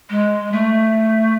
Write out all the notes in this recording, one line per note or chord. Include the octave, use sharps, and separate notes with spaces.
G#3
A3